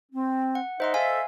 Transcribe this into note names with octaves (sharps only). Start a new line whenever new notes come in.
C4
F#5
D#4 C5 D#5 E5 F#5 C6
A4 E5 F5 G#5